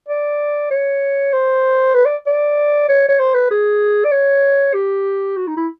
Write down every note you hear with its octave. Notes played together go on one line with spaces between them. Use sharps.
D5
C#5
C5
B4
D5
D5
C#5
C#5
C5
B4
G#4
D5
C#5
G4
F#4
D#4
E4